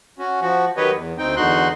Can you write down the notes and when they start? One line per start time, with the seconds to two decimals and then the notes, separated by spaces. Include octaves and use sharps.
0.19 C#4 F#4
0.41 F3 F#4
0.77 D#3 F#3 G4 B4 C#5 D#5
0.95 E2
1.18 D2 C4 D#4 G5
1.36 E2 D3 D#4 F#4 C6 F#6